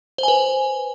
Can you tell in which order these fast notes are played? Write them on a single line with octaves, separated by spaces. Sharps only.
C5 G#5 B4